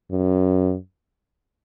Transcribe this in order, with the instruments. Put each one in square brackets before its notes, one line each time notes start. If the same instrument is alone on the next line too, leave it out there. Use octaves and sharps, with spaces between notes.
[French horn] F#2